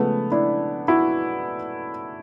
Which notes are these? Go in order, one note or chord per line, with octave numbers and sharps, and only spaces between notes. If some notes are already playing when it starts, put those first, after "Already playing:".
Already playing: C#3 F3 G#3 A3 B3
D4 E4
E4 F#4